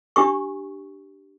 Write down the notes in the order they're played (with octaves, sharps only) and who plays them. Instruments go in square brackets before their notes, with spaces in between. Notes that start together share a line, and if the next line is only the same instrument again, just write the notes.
[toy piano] D4 G4 C#6